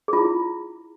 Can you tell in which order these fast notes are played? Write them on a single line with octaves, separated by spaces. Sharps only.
G#4 F4 E4